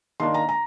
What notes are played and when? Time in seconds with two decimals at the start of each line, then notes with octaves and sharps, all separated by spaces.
0.20 D#3 A#3 D4 C6
0.34 A#5
0.49 A#5